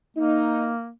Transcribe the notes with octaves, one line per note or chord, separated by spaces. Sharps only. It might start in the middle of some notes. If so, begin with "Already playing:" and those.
A#3 D#4